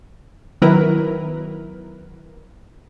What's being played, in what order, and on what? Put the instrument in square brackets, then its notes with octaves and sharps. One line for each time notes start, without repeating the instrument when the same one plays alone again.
[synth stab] D#3 F#3 B3 E4 A#4 B4